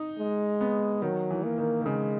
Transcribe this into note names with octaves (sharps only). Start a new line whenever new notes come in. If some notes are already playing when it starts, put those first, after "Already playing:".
Already playing: D#4
G#3
B3
D#3 F#3
E3
A#3
D#3
D#3
C#3 G#3